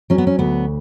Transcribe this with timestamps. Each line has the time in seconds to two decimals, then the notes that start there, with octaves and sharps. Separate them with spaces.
0.10 F#3 C#4
0.18 B3
0.27 C#4
0.39 D2 B3